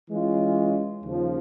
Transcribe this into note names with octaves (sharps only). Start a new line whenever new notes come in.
E3 G#3 C#4 F4
D#2 C#3 F3